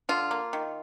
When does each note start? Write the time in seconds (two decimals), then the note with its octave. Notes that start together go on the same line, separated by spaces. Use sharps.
0.09 D3 F4
0.31 A#3
0.53 D#3